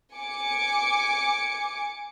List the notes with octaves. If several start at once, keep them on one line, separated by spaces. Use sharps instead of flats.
G#5 D6 C#7